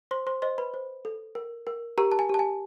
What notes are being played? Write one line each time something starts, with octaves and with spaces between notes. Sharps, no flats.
C5 C6
C5 C6
C5 D#5 C6
B4 B5
C5
A4
A#4
A#4
G4 A#4 A#5
A5
G#5
G4 A5
G#5